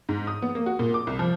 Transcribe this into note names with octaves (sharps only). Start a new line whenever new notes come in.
G#2
D#6
B3
A#3
F#4
A#2
D6
C2
F3